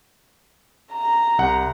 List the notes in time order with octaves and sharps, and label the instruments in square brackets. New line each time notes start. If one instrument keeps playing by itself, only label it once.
[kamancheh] A#5
[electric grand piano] C2 F#5